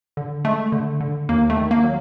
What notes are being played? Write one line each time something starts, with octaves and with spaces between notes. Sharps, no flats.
D3
G#3 A3
D3
D3
D#2 A#3
A3
D#3
A#3
F#3